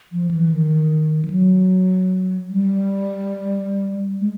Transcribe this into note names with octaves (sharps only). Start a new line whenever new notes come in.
F3
E3
D#3
F3
F#3
G3
G#3